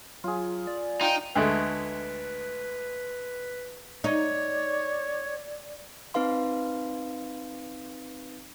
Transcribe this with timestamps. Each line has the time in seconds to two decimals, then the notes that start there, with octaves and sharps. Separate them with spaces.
0.24 F#3 F4 G#4
0.67 D5
1.01 D#4 F4 G5
1.35 D2 G#3 A3 B4
4.04 D#4 C#5 D5
6.14 C4 D#4 B4 F5 C6